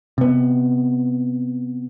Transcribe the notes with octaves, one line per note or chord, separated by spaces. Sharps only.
C3 B3